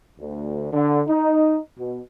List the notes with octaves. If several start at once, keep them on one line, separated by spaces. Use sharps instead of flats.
D2
D3
D#4
B2